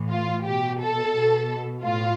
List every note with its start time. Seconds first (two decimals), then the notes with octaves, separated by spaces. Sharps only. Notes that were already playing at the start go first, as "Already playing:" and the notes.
Already playing: A2 E3
0.11 F4
0.45 B2 G4
0.81 A4
1.15 B2
1.84 A2 F4